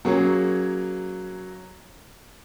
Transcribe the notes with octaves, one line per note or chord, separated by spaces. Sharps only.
F#3 A#3 C#4 G#4 C#5